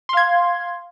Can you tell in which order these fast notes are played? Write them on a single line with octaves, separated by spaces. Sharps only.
C6 F5 G#6